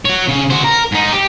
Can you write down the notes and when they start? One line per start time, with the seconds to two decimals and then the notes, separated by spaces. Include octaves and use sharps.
0.05 F#4 C#5
0.28 C#3
0.50 F#4 C5
0.64 A#4
0.92 G#2 D#4
1.12 G4